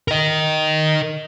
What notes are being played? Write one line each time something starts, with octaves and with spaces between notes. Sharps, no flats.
A#4 D#5